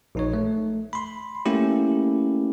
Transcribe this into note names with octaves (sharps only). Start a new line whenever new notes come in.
A#1 D#4 C#5
A3
B5 C6
A3 A#3 C#4 E4 G4